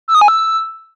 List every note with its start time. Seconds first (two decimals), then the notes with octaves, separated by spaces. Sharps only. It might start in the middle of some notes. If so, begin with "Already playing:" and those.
0.08 E6
0.15 D#6
0.21 G#5
0.28 E6